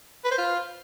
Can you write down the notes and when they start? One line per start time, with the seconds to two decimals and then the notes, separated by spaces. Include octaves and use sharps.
0.25 B4
0.31 C5
0.38 F4